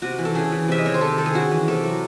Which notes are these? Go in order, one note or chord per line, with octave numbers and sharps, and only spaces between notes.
C3 F#4
E3
A4
C#3 G#4
E3
C3 E5
D#5
D#3 C#5
C5
C3 A4
D#3 A4
G#4
C#3 F#4
E3
C3 A4
F#3